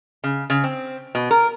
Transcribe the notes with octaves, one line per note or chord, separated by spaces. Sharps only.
C#3
C#3
C4
B2
A#4